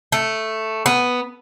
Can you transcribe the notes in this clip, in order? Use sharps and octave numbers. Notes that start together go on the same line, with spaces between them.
A3
B3